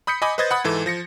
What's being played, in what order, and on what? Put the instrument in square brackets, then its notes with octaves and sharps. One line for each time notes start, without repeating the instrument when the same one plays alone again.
[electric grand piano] B5 D#6 G6 B6 C#7
D#5 G#5 B5 D6 D#6
B4 C5 D#5 D#6 G#6 A6
F#5 B5 D#6
G#2 E3 A4
F3 A#6 C#7